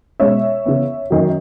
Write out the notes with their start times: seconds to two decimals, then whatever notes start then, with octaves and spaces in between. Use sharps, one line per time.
0.20 B2 G#3 C#4 C#5 E5
0.66 C#3 E3 B3
1.10 F#2 D#3 F#3